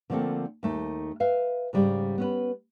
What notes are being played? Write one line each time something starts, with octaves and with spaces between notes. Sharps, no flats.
D3 F3 A3 A#3 C4 A4
D#2 A3 D#4
B4 E5 F5
G#2 C#3 G3 D4
B3 C#4 B4